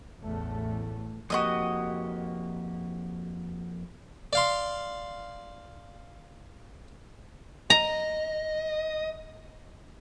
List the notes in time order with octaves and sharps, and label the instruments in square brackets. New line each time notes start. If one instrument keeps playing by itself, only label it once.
[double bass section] A1 E2 A2 A3
[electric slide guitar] F2 A#3 G4 [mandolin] F#4 D#5 D#6
[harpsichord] D5 F5 C6
[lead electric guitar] D#5 [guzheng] A#5